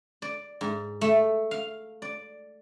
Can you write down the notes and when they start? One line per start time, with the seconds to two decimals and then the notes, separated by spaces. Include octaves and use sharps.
0.22 D5
0.61 G#2
1.01 A3
1.51 F5
2.02 D5